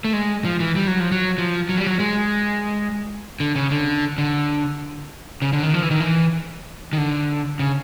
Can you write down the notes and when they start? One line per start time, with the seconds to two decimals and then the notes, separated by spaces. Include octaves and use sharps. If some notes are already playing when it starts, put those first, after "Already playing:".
0.05 A3
0.13 G#3
0.45 F3
0.60 E3
0.76 G3
0.87 F#3
1.00 F3
1.12 F#3
1.38 F3
1.69 F#3
1.77 G3
1.87 F#3
2.00 G#3
3.40 D3
3.56 C#3
3.71 D3
4.18 D3
5.42 C#3
5.53 D3
5.63 D#3
5.74 F3
5.83 E3
5.91 D#3
6.00 E3
6.93 D#3
6.97 D3
7.59 C#3